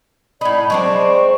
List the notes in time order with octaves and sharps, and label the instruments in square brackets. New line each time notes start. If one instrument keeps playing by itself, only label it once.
[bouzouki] A2 D#4 [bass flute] D5 [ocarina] B5
[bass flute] F#3 [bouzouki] G#3 C4 D4 [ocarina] C#6
[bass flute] C5